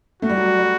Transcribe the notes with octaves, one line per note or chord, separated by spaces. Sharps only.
A3 F#4
G3
F#3
G3
G3